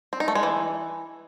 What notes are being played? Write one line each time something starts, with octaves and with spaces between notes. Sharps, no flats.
C4
D#4
A3
G#3
E3